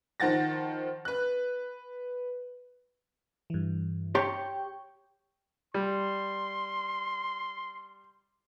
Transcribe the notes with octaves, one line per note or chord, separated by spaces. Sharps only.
D#3 F3 F#5 A6 A#6
B4 F#6
G2 E3
G4 C#5 G5 C6 C#6
G3 C6